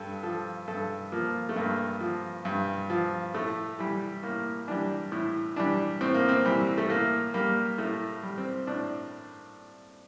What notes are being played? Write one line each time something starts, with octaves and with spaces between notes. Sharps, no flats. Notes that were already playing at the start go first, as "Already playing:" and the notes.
Already playing: G2 A4
F3 A4
G2 A4
F3 A#3
A3
G2 A#3
F3
G2
F3
A2 A3
E3 G3
A2 A#3
E3 G3 D4
A2 E4
E3 G3 D4
A2 C4
A#3
C4
E3 G3
A3
A2 A#3
G3 A#3
A2 A3
G3
C4
A2 D4